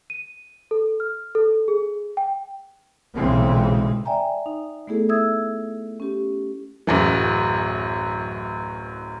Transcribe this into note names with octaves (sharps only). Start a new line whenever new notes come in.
D#7
A4
F6
A4
G#4
G5
B1 A#2 C#3 E3 G#3 C4
D5 E5 G5 G#5 A#5
D#4
A3 B3 E4 G#4 A4
E5 D#6 E6 G#6
C#4 G4
D1 F#2 E3